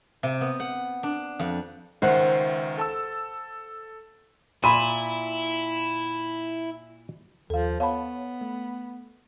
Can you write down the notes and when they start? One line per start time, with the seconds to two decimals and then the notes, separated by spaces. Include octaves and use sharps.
0.23 C3
0.41 B3
0.60 F#5
1.03 D4
1.39 F2
2.02 C#2 D#3 C5 E5 F#5
2.78 A4 A5 E6
4.64 A#2 E4 B5 D#7
7.50 D#2 F3 A4 F5
7.80 B3 C#5 F5 A5 B5
8.41 A3